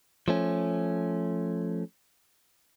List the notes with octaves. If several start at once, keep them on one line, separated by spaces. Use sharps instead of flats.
F3 A3 C#4